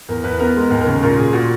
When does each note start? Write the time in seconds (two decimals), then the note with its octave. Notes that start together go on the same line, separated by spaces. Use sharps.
0.09 E2 A#4
0.24 E2 B4
0.40 B3 A#4
0.56 G#3
0.70 D#2 A#4
0.81 A#4
0.87 C#3
0.92 A#4
1.03 A#2 A#4
1.17 A#2 G#4
1.33 A#2 F#4